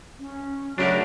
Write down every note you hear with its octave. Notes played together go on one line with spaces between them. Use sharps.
C#4
C#3 F#3 A3 D4 F#4 G4 A#4